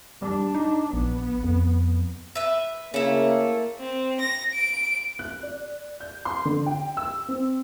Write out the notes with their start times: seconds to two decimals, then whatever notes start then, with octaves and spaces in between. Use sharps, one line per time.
0.22 G3 D4
0.55 D#4
0.93 A#1 B3
1.44 F2
2.35 B4 E5
2.94 C#3 A3 A#3 E4
3.79 C4
4.20 A#6
4.54 D7
5.19 F#6
5.43 D5
6.00 G6
6.25 C6
6.45 D3
6.66 G5
6.97 E6
7.28 C4